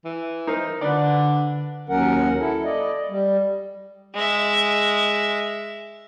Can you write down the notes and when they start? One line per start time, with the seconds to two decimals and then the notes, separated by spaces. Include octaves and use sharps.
0.05 E3
0.47 D#4 A#4 C5
0.81 D3 D4 B4 D5
1.89 D#2 F#3 C#4 A#4 F#5
2.39 E4 A4
2.65 D5 D#5
3.09 G3
4.14 G#3 E5